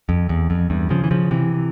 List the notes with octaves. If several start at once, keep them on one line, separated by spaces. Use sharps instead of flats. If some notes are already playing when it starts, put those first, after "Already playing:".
F2
E2
F2
E2 G2
C#3 F3
E3
C#3 F3
C3 E3